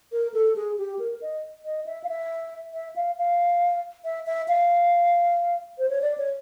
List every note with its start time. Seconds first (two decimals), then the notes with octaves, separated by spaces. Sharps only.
0.12 A#4
0.34 A4
0.56 G#4
0.78 G4
0.99 A#4
1.22 D#5
1.65 D#5
1.86 E5
2.04 F5
2.09 E5
2.74 E5
2.96 F5
3.18 F5
4.05 E5
4.27 E5
4.48 F5
5.78 C5
5.89 C#5
6.02 D5
6.18 C#5